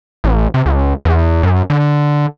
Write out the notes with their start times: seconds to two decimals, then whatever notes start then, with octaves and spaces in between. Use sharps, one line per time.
0.24 A1
0.54 C3
0.66 C#2
1.05 E2
1.43 F#2
1.70 D3